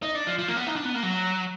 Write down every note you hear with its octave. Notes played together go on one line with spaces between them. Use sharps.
D#4
D4
F3
F3
A#3
B3
D#4
D4
B3
A#3
F#3